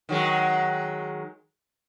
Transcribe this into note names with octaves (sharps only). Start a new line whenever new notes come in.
D#3 F#3 G#3